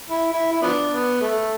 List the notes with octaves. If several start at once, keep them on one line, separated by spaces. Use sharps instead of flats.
E4
E4
E4
F3 B3 D4
B3
A3